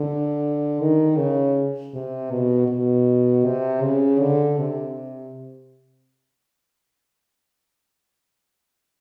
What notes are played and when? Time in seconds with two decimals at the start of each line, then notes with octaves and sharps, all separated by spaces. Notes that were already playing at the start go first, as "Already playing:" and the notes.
Already playing: D3
0.80 D#3
1.17 C#3
1.94 C3
2.31 B2
2.68 B2
3.45 C3
3.82 C#3
4.21 D3
4.58 C3